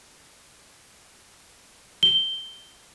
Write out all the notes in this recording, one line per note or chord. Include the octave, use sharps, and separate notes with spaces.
G7